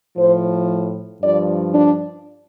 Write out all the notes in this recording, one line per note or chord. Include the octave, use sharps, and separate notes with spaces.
A2 F3 C5
G2 F3 D5
D4